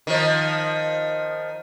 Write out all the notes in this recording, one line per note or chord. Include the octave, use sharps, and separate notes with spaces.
D#3 F3